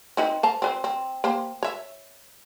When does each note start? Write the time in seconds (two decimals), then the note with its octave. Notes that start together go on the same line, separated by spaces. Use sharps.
0.17 C4 D#4 B4
0.43 C5 A5 A#5
0.62 C4 B4 C5
0.84 C4
1.24 A#3 G4 C5
1.63 C#5 E5